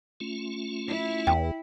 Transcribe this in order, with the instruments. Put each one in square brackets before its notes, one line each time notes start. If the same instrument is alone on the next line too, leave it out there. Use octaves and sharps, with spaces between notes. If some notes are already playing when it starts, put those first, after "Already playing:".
[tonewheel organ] A3 C#4 F4
[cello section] E4
[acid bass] E2 [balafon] G5